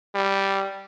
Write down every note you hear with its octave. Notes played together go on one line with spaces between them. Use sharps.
G3